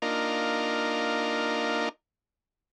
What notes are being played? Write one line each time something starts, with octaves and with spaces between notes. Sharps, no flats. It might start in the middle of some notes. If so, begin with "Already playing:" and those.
A#3 D4 D#4 F4 A#4